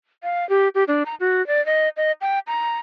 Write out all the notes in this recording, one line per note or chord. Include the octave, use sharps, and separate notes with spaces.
F5
G4
G4
D4
A#5
F#4
D5
D#5
D#5
G5
A#5